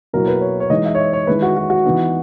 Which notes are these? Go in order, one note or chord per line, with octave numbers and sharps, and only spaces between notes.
B2 F#3 A#3 E4 A#4
B4
C#5
C#5
E3 G#3 D#4 D#5
E5
C#5
D#5
C#5
D#3 G#3 C#4 E4 B4
F#4
F#4
F#4
E3 B3 D#4